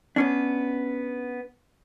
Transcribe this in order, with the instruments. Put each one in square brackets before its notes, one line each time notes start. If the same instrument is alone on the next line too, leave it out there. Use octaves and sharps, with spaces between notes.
[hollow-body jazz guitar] B3 C#4 D4